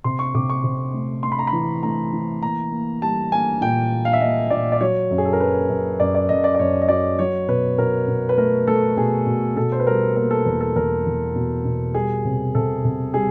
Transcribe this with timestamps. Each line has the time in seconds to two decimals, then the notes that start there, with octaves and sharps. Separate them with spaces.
0.04 C3 C6
0.19 C#6
0.35 C3 D6
0.50 C#6
0.64 C3
0.94 A3
1.23 A3 C6
1.32 B5
1.39 A#5
1.47 B5
1.53 E3
1.83 A3 A#5
2.13 E3
2.42 A#3 A#5
2.72 A#3
3.02 G3 A5
3.32 A#3 G#5
3.61 A#2 G5
3.91 A#3
4.05 F5
4.13 E5
4.21 A#3 D#5
4.50 A#2 D5
4.72 D5
4.81 F#3 C#5
5.11 F#2
5.18 G#4
5.25 A4
5.33 A#4
5.40 F#3 B4
5.70 F#2
6.00 F#2 D5
6.15 D5
6.29 F#2 D#5
6.44 D5
6.55 D5
6.59 F#2 C#5
6.82 D#5
6.89 F#3 D5
7.19 F#3 C#5
7.48 B2 B4
7.78 B2 A#4
8.08 B2
8.29 B4
8.38 A3 A#4
8.68 A3 A4
8.97 B2 G#4
9.27 B2
9.56 B2 A4
9.72 C5
9.80 B4
9.87 G3 A#4
10.16 A#3 A#4
10.31 A4
10.46 E2 A#4
10.61 A4
10.76 E2 A#4
11.06 E2
11.35 B2
11.65 B2
11.95 G3 G#4
12.25 C3
12.55 C3 A4
12.84 C3
13.14 G3 G#4